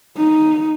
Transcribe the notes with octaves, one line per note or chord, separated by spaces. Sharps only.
D#4